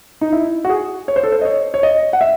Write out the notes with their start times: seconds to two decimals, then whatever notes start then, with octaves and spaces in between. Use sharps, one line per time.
0.21 D#4
0.32 E4
0.65 F#4
0.69 G#4
1.08 C#5
1.16 C5
1.23 A4
1.32 C5
1.41 D#5
1.45 C#5
1.74 C#5
1.83 D#5
2.13 F#5
2.21 E5